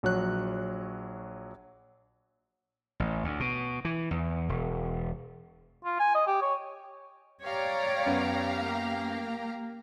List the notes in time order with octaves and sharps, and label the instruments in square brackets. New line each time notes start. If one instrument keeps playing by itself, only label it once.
[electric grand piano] A#1 F#3 C#5 F#6
[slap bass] A1
D2
B2
E3
E2
E1
[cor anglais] F4
G#5
D#5
G4
C#5
[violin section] G4 F5 A#5 [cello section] C#5 D5
[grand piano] F#2 B3
[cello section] A#3